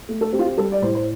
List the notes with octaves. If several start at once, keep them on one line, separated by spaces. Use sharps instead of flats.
A3
A4
C4 G4
F4
G4
G3 A4
D5
A2 C5
C5